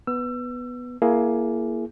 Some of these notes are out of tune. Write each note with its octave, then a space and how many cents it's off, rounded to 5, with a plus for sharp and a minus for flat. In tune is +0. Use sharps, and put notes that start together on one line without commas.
B3 +0 E6 +30
A#3 +10 E4 +25 G#4 +20